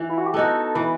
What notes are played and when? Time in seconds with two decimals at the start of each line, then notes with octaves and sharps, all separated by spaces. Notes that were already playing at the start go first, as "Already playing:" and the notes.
Already playing: E3
0.09 E4
0.18 F#4
0.26 G4
0.34 B3 D#4 F#4 A4
0.75 E3 B4